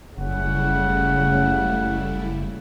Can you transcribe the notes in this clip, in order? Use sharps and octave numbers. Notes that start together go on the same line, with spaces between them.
F#1 C#3 G3 A3 E4 F#5